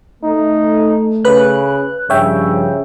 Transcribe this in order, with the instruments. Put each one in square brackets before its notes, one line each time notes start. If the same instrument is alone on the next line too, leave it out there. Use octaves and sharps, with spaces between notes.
[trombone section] A3 [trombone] D#4
[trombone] C#3 [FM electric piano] B4 F#6
[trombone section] G2 F3 [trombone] C#3 [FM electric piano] C#5 E5 G5